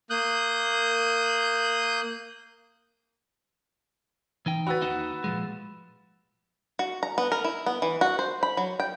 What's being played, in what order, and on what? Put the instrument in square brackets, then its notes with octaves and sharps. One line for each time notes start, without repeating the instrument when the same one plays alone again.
[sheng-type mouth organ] A#3 D#6 F#6 G6
[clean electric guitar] E3 D#4 G5
[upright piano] F#4 B4 [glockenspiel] B5 E6 A6
[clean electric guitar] D#2 D#4 F#5 [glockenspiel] E7
[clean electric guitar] A#2 F3 G#3
[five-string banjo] F#4
A#5
B3
A#4
E4
B3
E3
F#4
C5
B5
F#3
G5